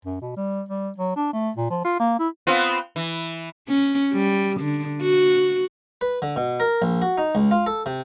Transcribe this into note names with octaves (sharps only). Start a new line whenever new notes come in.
F#2
B2
G3
G3
F#3
D4
A3
A#2
F3
F4
A#3
E4
B3 C4 F4
E3
C#4
G3
D3
F#4
B4
D3
B2
A#4
A#1
F#4
D#4
C#2
F4
A4
C3